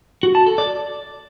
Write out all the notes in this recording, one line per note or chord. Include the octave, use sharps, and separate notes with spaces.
F#4
A5
A4
D5